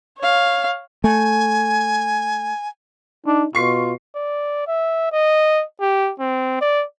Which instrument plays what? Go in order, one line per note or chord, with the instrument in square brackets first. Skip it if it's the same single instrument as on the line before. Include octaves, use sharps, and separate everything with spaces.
[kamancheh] C#5 F5
[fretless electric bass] A3 [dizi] G#5
[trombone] D4 [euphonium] D#4
[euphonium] B2 [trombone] F4 [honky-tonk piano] C#6 C7
[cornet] D5
E5
D#5
G4
C4
D5